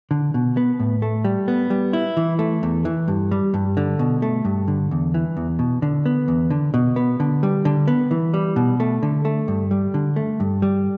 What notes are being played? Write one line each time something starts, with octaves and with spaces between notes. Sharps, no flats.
D3
B2
B3
A2
A3
G3
B3
G3
E4
E3
A3
E2
E3
G2
G3
G2
D3
B2
A3
G2
D3
E2
E3
E2
B2
D3
B3
E2
D3
B2
B3
D3
G3
D3
B3
E3
G3
B2
A3
D3
A3
G2
G3
D3
A3
G2
G3